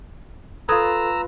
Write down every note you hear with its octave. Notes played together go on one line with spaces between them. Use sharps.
F4 A4 B4 A#5 D#6 E6 G#6